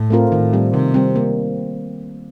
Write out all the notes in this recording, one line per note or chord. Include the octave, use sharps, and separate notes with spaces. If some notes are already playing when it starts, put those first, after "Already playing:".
Already playing: A2
A3 C4 F4 A#4
A2 D#3
G3 C4
C3 D#3
G3 C4
A#3